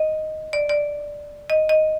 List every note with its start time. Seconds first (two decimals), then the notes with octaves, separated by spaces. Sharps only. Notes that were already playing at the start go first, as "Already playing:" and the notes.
Already playing: D#5
0.53 D5
0.69 D5
1.50 D#5
1.69 D#5